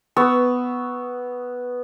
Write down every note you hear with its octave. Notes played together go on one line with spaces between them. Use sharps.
B3 C#6 E6